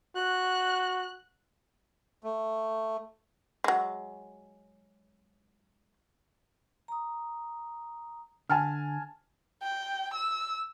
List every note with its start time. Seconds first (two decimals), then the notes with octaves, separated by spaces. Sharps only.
0.16 F#4 F#6
2.24 A3
3.64 F#3 G#3
6.88 A#5 D#6
8.50 D3 G#5 A5 F6
9.63 G5
10.14 E6